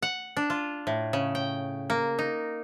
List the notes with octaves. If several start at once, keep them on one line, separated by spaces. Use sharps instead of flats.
F#5
D4
F4
A2
C#3
G5
A#3
D#4